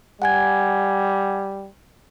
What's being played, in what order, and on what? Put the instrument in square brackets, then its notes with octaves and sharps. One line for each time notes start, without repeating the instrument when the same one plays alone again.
[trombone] G3 [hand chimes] F#5 G#5 G#6